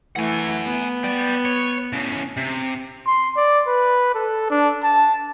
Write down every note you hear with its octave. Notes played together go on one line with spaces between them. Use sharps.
E3 A3 F#5 G#5
B3
D5 G5
C#5
A2 C#3
C3
C6
D5
B4
A4
D4
A5